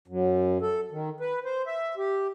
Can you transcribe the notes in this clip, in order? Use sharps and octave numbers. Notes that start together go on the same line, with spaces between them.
F#2
A4
D#3
B4
C5
E5
G4